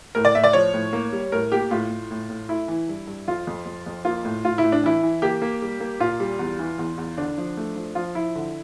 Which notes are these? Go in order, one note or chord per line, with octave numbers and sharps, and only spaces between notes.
A2 A#4
D5
A2 E5
D5
F3 C#5
A2
A#3
G3
A2 A#4
A#3 G4
A2 F4
A2
A2
A2
A3 E4
E3
G2
G2
F2 F4
F2
F2
F2
A#3 F4
A2
A2 F4
E4
A2
D4
E3 E4
E3
A#3 G4
A#3
G3
A#3
A#2 F4
G3
E2
E3
E2
E2
D3 D4
F3
A3
F3
F3 F4
F3 E4
D3